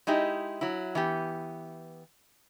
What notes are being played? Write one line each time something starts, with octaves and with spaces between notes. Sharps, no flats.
G#3 D#4 E4 G4
F#3 E4
E3 B3 G4